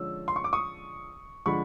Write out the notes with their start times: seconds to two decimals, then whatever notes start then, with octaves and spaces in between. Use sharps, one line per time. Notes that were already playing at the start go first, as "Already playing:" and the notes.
Already playing: D3 F3 G#3 C#4 E6
0.28 C6
0.36 C#6
0.44 D6
0.53 C#6 D#6
1.46 D3 F3 G#3 B5 C#6